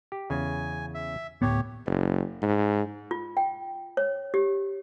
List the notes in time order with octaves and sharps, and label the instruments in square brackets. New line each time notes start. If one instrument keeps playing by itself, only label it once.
[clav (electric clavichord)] G4
[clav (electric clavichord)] E2 C#3 [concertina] G#5
[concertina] E5
[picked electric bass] D2 A2 B3 [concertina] G4 C#5
[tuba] F#1
G#2
[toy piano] F4
G5
C#5
G4